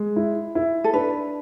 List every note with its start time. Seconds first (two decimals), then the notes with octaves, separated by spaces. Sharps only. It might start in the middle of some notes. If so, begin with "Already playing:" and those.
Already playing: G#3
0.16 E4
0.55 E4
0.84 A4
0.94 D4 B4